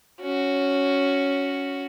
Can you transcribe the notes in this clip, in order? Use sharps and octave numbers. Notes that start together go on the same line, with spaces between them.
C#4 F#4